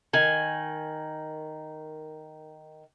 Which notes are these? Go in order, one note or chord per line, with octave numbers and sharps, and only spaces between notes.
D#3 G#5